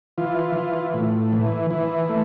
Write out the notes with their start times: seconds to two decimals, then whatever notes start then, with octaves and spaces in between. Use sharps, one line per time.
0.18 E3 F4
0.56 E3
0.94 A2
1.32 E3
1.71 E3
2.09 A3